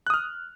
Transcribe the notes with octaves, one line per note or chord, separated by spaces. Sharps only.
D#6 F6 F#6